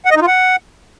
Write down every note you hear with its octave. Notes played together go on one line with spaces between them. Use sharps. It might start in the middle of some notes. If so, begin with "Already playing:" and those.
F#5
D#5
D#4
F4
F#5